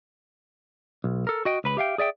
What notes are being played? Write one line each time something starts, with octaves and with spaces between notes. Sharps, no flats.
B1
A4 A#4
F#4 D#5 G5
C#2 B4 B5
G4 E5 F5 G5
G#4 D5 E5 G5